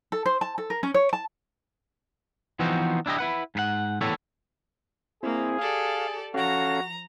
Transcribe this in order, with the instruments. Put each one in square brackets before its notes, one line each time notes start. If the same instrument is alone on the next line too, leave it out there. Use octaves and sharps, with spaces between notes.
[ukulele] A4
C5
A5
A4
A#4
C#4
C#5
A5
[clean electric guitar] E3 F3 B3 C4 D#4 F#4
D4 E4 G4 D#5
E4 B4 F#5
G#2 B4 F#5
E2 A2 D3 E4 A4 C#5
[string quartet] A#3 [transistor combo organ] C4 E4 [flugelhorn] G#4
[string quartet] G4 A4 D5 [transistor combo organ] F5
[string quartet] F3 A#5 [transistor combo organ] C#4 A4 F5 [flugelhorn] F#4